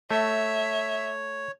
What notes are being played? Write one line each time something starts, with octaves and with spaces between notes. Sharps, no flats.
A3 C#5 E5